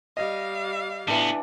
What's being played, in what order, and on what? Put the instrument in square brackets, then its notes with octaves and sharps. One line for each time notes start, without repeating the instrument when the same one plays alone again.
[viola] G3 F5 [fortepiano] D#5
[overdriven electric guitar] A2 B3 [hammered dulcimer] E3 D4